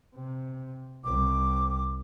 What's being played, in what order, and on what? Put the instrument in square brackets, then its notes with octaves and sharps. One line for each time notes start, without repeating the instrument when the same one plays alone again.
[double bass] C3
[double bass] C2 [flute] D6